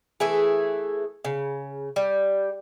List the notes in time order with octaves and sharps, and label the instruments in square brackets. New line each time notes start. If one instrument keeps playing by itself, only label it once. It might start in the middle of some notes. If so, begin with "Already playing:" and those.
[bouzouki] E3 A3 G#4
C#3
G3